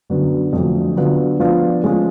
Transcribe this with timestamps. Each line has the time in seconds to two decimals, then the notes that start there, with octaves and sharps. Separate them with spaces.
0.09 F#2 D3 F#3 B3 F#4
0.53 F2 D3 F#3 A3
0.96 D3 F#3 B3 F4
1.40 F3 B3 D4 F4
1.84 F3 G#3 C#4